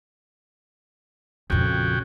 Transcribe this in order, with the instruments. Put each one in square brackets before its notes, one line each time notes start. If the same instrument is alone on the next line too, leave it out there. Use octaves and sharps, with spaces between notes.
[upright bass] A#1 F2 [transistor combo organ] C#3 F#4 G5